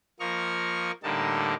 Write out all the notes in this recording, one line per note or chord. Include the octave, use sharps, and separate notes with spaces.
F3 A#3 D#5 C#6 F6
A2 D3 G3 A#3 D#4 A5